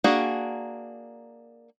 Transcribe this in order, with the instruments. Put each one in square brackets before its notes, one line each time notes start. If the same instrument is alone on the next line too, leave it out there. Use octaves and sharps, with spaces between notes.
[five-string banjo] A#3 D4 F#4 G#4